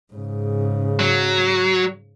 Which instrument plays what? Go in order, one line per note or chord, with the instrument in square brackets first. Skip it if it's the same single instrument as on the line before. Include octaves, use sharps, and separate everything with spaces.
[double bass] G#2 C#3
[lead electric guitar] F#3